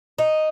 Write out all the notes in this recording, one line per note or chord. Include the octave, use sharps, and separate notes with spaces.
D#4